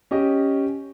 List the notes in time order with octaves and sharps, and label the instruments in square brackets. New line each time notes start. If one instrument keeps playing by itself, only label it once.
[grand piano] C#4 G4 D#5